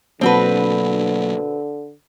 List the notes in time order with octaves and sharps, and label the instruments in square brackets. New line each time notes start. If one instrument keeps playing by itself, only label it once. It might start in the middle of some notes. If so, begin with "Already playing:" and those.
[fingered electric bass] B2 F#3 A#3 [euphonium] D3 [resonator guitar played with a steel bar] C4 F#4 B4